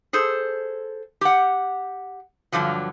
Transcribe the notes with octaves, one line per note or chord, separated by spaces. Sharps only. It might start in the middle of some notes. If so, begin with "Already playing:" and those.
G#4 A4 C5
G4 F#5
G2 B2 D3 F3 F#3